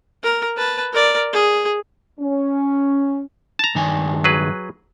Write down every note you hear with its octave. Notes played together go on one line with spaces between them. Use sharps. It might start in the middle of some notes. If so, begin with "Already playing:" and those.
A#4
B4 A5
A#4 D5
G#4
C#4
A5 A#5
G2 D#3 G#5
F#3 G#4 B4